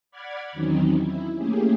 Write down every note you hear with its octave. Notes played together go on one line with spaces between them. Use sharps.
D5 F#5 B5 D6 F6 G#6
E2 D#3 F#3 C4 C#4 D#4
E4
A3 A#3 C#4 G4 G#4